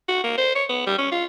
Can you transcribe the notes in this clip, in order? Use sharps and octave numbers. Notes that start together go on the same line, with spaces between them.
F#4
A#3
C5
C#5
B3
G3
C#4
F4